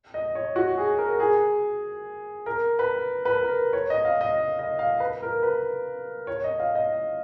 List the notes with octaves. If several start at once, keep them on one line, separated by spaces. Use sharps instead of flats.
D#5
C#5
F#4
G#4
A#4
G#4
A#4
B4
B4
A#4
C#5
D#5
F5
D#5
D#5
F5
B4
A#4
B4
C#5
D#5
F5
D#5